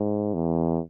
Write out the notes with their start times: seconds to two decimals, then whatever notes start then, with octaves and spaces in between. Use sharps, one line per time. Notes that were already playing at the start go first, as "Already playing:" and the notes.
Already playing: G#2
0.34 E2